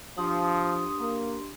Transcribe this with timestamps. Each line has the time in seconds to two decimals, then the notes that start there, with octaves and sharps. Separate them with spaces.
0.18 F3 D4 G4 C6 D#6
0.98 A#3